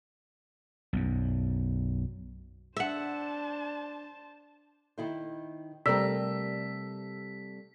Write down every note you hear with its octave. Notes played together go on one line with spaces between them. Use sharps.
B1 F#2
D4 C5 E5 F#5 A5
D#3 E4 C5
C3 G3 A3 A#4 D5 E6 B6